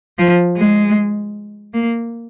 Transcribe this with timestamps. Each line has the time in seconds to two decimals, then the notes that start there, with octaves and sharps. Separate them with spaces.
0.18 F3
0.57 G#3
1.74 A#3